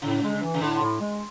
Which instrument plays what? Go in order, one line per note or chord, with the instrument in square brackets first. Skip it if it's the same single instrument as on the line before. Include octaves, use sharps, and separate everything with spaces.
[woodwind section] A2 [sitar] C#3
[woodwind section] G#3
E3
[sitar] C#3
[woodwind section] A2 [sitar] D3
[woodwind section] A2
G#3